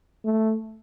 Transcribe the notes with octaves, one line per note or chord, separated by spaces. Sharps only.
A3